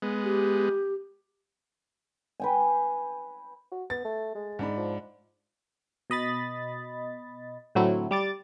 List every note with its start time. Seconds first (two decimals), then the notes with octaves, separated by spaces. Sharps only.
0.02 G#3 B3
0.24 G4
2.40 B4 G5 G#5
3.72 F#4
3.90 B3 A6
4.05 A3
4.35 G#3
4.59 G#2 D4 B5
4.77 F3
6.10 B2 D#5 B5 A6
7.75 A2 D3 F#3 A3 C4 E4
8.11 G3 D6 A6